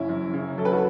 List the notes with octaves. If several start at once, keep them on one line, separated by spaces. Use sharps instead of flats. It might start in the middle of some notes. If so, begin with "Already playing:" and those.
Already playing: F#1 C#4 E4
F#2
C#3
F#3 A4
B4
F#4 A4